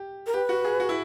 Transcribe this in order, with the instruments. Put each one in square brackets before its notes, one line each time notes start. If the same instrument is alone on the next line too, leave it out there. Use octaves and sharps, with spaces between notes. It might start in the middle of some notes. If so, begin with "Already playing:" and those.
Already playing: [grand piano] G4
[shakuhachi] A#4
[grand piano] G4 [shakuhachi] B4
[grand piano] F#4
G#4
F#4
E4